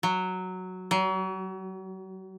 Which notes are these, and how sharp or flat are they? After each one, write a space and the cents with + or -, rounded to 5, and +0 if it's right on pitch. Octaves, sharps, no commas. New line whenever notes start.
F#3 +0
F#3 +40